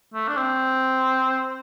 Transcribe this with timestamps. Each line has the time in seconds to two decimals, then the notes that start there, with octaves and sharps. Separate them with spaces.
0.14 A3
0.28 D4
0.37 C4